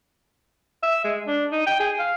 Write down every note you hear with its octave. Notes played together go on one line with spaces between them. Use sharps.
E5
G#3
D4
D#4
G5
G#4
F5